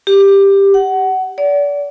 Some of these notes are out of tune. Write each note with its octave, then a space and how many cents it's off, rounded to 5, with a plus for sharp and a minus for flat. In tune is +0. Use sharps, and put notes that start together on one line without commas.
G4 +10
F#5 +20
D5 -30